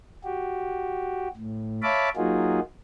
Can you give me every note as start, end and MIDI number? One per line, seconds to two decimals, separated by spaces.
0.24 1.28 66
0.24 1.28 67
1.37 1.81 45
1.83 2.09 73
1.83 2.09 76
1.83 2.09 77
1.83 2.09 81
1.83 2.09 83
1.83 2.09 86
2.16 2.60 54
2.16 2.60 58
2.16 2.60 63
2.16 2.60 65
2.16 2.60 66
2.16 2.60 68